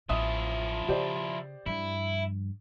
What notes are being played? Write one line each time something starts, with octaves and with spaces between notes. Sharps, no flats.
A1 F3 B3 E4 E5 D#6
C#3 G4 C5 D5
G2 F3 E4